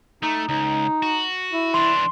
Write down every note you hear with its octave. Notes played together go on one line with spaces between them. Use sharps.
A3 D#4
C#2 D#4
F#4
E4
E3 D4 C6